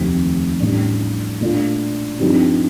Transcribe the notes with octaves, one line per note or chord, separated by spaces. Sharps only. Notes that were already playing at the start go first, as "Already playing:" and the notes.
Already playing: F1 D#2 D#3 A3 C4
A1 A2 G3 D4
A#2 A3 D4 F4
G2 F3 C4 D#4